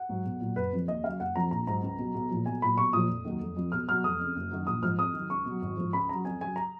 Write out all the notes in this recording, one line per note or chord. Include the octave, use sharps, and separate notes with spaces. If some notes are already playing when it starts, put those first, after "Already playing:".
Already playing: F#5
G#2 F#3
B1
A#2 F#3
F#1 B4
F2 F3
D#2 D#5
C#3 F#3 F5
F#1 F#5
F2 F3 A#5
A#1 A#5
G#2 F#3 A#5
C#2
B2 F#3
B1
A#2 F3
B1 G#5
A#2 F#3 B5
B1 C#6
A#2 F3 D#6
F1
D#2 D#3 F#3
F1
F2 F3
B1 F6
B2 F#3 F6
F1 D#6
F2 C#3
F#1
F#2 D#3 F#3
A#1 D#6
G#2 F3 F6
F2 D#6
D#3 F#3
C#2 C#6
B2 F#3
G#1
G#2 F3
C#2 B5
C#3 F#3 A#5
F2 G#5
C#3 F#3 G#5
A#5